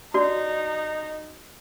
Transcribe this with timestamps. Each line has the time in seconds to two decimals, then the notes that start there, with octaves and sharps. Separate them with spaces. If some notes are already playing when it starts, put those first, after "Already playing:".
0.14 D#4 F#4 D5